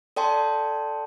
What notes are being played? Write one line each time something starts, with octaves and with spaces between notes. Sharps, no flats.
A4 D5 G5 A5 C6